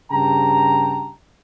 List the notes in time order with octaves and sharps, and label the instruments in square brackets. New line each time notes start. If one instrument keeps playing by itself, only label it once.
[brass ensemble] G2 C#3 G4 G5 A5 A#5